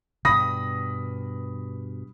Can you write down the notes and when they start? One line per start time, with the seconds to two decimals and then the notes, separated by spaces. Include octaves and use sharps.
0.25 G2 B2 B5 D#6 A#6